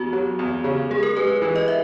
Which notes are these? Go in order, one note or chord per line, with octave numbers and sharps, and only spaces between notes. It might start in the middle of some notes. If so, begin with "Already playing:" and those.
Already playing: E2 F#4
F#3
E2
C#3
G#3 G#4
A#4
G#3 B4
E3
D#5
E5